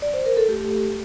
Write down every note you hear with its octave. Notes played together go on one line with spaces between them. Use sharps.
D5
C5
A#4
A4
A3 G4